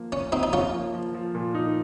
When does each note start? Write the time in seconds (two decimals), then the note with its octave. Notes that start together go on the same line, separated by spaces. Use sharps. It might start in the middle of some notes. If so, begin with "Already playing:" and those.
Already playing: F3 A#3
0.12 A#3 C#4
0.32 F3 C4 D#4
0.43 D#4
0.53 F3 C#4 F4
0.73 A#3
0.94 F3
1.14 F3
1.35 A#2
1.55 D#4